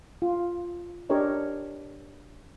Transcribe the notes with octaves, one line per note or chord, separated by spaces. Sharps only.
F4
D4 G4 A#4 C#5 D#5